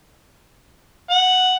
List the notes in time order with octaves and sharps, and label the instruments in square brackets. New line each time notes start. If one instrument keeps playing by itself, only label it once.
[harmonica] F#5